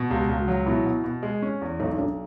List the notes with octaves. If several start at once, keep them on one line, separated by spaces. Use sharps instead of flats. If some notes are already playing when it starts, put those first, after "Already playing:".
Already playing: B2
C#2 G4
C#2
F#4
F#3
B2 E4
B2
B2
G#3
C#4
E2
B1 D#4
B1 D4